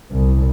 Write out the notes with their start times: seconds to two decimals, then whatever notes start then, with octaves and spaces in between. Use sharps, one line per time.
0.11 C2